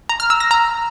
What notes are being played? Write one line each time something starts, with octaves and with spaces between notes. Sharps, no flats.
A#5
F6
E6
A#6
A#5